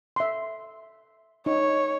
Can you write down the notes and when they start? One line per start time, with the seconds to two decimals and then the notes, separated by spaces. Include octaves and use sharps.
0.16 E5 C6
1.46 D#4 C#5